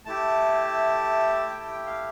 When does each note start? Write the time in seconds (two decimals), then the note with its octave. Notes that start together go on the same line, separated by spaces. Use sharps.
0.06 A3 E4 G4 A5
1.50 G5
1.60 A5
1.68 G5
1.86 F5